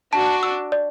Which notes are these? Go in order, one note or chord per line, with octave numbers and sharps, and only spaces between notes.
D4 F#4 A5
E6
D5